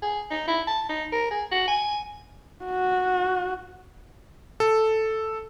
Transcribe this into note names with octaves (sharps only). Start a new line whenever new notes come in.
G#4
D#4
E4
A5
D#4
A#4
G#4
F#4
G#5
F#4
A4